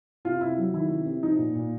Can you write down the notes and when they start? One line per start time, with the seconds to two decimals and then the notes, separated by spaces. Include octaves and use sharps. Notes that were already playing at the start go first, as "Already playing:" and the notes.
0.25 C3 F4
0.41 C3 E4
0.58 F#3
0.74 D#3 E4
0.90 C3
1.06 C3
1.22 F3 D#4
1.38 A#2
1.55 A#2